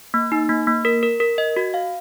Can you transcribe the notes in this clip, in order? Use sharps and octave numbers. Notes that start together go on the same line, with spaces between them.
A#3
D#4
A#3
A#3
A#4
A#4
A#4
D#5
F#4
F5